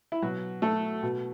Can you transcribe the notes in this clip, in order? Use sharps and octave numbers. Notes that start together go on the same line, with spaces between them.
E4
B2 F#3 F#4
A3 A4
B2